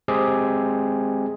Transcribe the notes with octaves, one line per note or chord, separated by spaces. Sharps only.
G#3 C4 G4 G#4